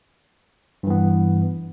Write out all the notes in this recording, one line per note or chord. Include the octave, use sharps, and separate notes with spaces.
G2 E3 B3